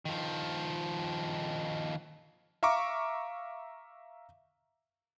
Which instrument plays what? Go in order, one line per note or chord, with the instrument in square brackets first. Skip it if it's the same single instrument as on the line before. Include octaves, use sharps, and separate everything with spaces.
[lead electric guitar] D#3 F3
[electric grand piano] E5 F5 A#5 C#6 D6